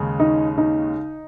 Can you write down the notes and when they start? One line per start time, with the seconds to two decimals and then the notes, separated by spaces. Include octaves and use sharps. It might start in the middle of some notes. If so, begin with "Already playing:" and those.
Already playing: D#2 C#3 G#3 C#4
0.20 D#4
0.58 D#4